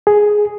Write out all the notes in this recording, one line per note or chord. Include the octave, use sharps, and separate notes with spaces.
G#4